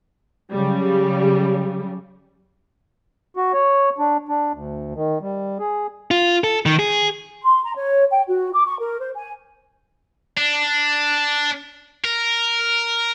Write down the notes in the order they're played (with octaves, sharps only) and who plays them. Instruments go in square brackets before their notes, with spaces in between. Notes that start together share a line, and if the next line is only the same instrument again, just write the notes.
[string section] C#3 F#3 G3
[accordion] F#4
C#5
D4
D4
D2
D#3
G3
G#4
[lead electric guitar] F4
A4
D#3
G#4
[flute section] C6
A#5
C#5
G5
F#4
D6
C#6
A#4
C5
G#5
[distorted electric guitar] D4
A#4